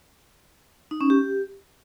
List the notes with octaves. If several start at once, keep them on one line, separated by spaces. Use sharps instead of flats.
D#4
C#4
G4